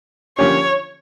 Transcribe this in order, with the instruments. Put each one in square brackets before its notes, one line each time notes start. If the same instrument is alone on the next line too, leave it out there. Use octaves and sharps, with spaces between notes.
[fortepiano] D3 F3 A#3 C#4 G4 [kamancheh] C#5